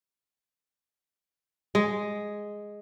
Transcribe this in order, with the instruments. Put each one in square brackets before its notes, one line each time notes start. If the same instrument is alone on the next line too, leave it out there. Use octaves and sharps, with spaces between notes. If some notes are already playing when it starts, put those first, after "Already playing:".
[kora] G#3